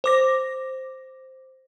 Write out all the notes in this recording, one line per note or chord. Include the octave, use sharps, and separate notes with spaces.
C5 D6 A#6